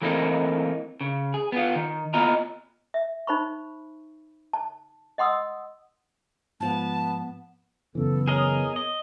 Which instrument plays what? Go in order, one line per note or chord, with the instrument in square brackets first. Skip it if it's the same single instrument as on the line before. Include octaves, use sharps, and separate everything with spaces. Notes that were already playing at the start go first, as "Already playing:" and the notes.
[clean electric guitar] E3 A3 A#3 C4 D#4
C#3
G#4
B3 F4
D#3
A#3 B3 F4 D#5 A#5
[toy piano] E5
D#4 C5 B5 C#6
A5
D#5 F#5 C6 D#6 E6
[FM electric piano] G#2 F3 [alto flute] B3 [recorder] A5
[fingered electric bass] F#2 C#3 E3 [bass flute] B3 [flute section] A4
[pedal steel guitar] G#4 A#4 D#5 [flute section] C#5 D#6
[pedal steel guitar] D#5